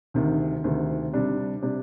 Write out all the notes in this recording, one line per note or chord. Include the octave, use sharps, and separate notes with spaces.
D2 C3 D#3
D2 C3 D#3
C3 G3 D4
C3 G3 D4